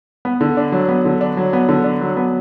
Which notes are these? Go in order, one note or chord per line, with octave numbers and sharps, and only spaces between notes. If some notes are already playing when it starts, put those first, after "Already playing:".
B3
D3
D4
F#3
B3
D3
D4
F#3
B3
D3
D4
F#3
B3